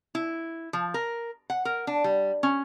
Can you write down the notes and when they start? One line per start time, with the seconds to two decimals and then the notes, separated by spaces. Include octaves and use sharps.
0.15 E4
0.73 F3
0.94 A#4
1.50 F#5
1.65 A#4
1.87 D4
2.04 G3
2.43 C#4